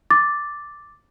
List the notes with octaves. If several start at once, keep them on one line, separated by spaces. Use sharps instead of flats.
D6 A6